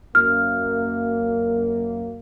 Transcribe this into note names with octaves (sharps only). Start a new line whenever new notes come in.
F#2 A#3 F6